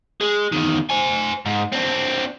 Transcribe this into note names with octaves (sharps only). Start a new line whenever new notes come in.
G#3
E2 D#3
C5 G#5
G#2
C4 D4